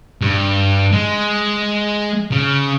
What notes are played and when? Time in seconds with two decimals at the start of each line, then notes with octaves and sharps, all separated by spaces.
0.21 G2
0.93 G#3
2.32 C#3